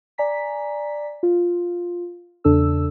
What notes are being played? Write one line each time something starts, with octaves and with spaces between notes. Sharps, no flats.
D5 G#5 A#5 B6
F4
E2 C#3 D4 A4 E6